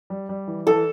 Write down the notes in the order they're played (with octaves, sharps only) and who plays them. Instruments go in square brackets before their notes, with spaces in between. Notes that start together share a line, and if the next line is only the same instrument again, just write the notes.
[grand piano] G3
G3
E3
[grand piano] E3 [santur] A4